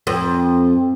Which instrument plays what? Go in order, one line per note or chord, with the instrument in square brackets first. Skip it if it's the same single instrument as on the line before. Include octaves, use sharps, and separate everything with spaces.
[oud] F2